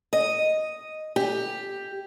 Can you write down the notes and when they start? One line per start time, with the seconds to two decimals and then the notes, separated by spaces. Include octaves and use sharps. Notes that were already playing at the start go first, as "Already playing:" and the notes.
0.13 D#5
1.16 G4